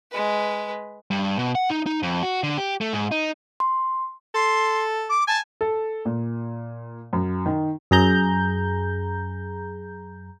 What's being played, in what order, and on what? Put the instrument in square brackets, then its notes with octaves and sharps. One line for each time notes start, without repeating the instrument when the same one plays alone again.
[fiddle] G#3 B4
[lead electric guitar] G2
B2
F#5
D#4
D#4
F2
F#4
D3
G4
A3
G#2
D#4
[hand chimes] C6
[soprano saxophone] A4 [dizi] C6
[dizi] D6
[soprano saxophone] G#5 [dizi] A5
[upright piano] A4
A#2
F#2
D#3
[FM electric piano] F#2 G#4 A#5 G6